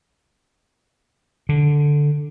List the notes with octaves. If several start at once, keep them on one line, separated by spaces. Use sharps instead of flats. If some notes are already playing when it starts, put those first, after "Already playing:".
D3